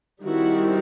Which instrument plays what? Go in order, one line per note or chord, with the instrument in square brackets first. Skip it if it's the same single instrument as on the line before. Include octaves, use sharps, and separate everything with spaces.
[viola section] D#3 G3 C4 E4 F#4